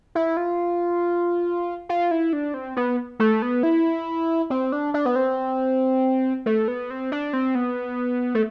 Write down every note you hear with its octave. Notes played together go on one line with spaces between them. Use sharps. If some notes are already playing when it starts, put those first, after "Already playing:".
E4
F4
F4
E4
D4
C4
B3
A3
B3
E4
C4
D4
D4
B3
C4
A3
B3
C4
D4
C4
B3
A3